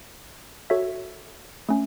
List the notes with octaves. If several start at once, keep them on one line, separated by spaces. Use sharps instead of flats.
F#4 A4 C#5 E5
A3 C#4